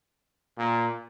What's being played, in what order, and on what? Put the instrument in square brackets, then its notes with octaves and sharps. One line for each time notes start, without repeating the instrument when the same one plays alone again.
[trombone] A#2